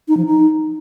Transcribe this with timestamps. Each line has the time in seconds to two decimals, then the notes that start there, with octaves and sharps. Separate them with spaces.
0.08 D#4
0.17 F3
0.26 D#4